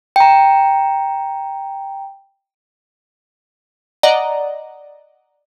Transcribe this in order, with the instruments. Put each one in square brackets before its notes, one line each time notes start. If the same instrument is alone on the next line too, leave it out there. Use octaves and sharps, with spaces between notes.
[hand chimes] G5 A#5
[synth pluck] D5 D#5 F#5 A#5